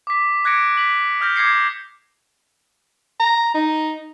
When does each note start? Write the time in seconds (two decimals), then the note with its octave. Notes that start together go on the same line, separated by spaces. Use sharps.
0.07 D6 B6
0.45 D6 F#6 G#6 A#6 C#7 D7
0.77 B6 F#7
1.21 D#6 F6 G6 A#6
1.36 D6 G#6 A#6 C7 C#7
3.20 A#5
3.54 D#4